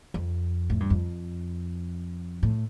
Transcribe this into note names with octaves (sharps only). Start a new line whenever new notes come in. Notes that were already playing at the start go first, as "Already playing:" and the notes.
F2
A2
G2
F2
A2